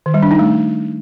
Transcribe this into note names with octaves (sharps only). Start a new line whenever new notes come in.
D#3
G3
D4
D#4
A3